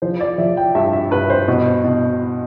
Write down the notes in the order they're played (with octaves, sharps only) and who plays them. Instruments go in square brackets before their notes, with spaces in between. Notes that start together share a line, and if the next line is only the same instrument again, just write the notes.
[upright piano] F3 C5
D5
F3 E5
G5
G2 E5
E5
G2 B4
C5
B2
B2